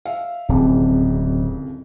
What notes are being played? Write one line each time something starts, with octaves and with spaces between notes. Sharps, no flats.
E5 F5
D1 C2 F2 C#3